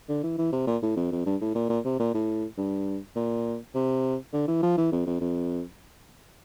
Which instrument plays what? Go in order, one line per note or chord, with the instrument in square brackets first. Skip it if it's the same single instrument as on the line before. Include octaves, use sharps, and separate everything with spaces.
[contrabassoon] D3
E3
E3
C3
A#2
A2
F2
F2
G2
A2
A#2
A#2
C3
A#2
A2
G2
A#2
C3
D3
E3
F3
E3
F2
F2
F2